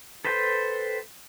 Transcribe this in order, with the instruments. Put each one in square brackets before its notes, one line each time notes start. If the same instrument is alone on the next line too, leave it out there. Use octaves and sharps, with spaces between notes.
[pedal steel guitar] A4 B4 C5 G5